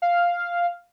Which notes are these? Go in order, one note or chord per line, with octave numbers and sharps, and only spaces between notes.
F5